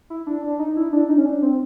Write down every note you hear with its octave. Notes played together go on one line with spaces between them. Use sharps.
E4
D4
D4
D#4
E4
D4
D#4
C#4
D4
C4